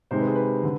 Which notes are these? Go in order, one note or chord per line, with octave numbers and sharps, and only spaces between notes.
C3 D#3 G#3 C5
B4
G#4
B4
D3